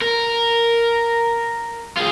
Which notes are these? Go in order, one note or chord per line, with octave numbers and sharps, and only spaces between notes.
A#4
F4 G#4